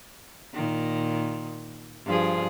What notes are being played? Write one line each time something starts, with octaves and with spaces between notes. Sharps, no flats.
A#2 D#3
G2 F3 G#4